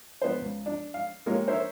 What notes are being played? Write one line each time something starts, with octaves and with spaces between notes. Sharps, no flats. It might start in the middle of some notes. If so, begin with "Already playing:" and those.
B3 C5
C#2
D4
F5
G#3 A#3 F4 G4 C#5
A#4 C5 C#5 E5